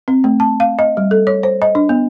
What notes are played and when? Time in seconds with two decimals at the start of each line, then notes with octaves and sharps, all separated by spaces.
0.08 C4
0.24 A3
0.40 A5
0.60 F5
0.79 D#5
0.97 G3
1.11 A4
1.27 C#5
1.43 C5
1.62 D#5
1.75 D4
1.89 B3